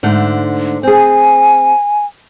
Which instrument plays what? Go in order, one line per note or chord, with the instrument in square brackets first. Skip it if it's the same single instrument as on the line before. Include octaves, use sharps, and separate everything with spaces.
[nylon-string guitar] G#2 D3 A3
[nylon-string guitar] C4 G#4 [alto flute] G#5